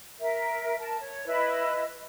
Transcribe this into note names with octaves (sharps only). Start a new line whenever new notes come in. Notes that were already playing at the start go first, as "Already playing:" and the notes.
A#4 E5
A#4 A5
C#5
E4 B4 D#5